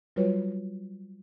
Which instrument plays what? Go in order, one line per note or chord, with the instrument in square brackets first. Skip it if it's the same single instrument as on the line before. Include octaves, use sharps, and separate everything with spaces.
[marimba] F#3 G3 F4 F#4 B4 C#5